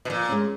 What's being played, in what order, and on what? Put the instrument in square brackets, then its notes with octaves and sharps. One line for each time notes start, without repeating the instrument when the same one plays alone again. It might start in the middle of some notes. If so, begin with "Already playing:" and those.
[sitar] B2
[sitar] A#2 [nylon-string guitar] F3
[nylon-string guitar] G#3 C#4